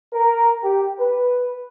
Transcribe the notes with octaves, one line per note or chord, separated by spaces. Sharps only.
A#4
G4
B4